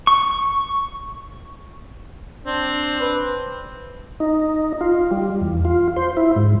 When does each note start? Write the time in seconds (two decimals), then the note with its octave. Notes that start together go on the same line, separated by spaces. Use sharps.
0.07 C#6
2.45 C4 D4
3.01 B4
4.20 D#4
4.81 F4
5.11 G3
5.41 E2
5.65 F4
5.96 C5
6.17 E4
6.36 G#2